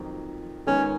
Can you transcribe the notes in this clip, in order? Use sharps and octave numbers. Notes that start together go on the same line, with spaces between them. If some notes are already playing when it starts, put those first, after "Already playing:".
Already playing: F2 D#3 F#3 A#3
D#3 G#3 B3 C#4 D#4 A#4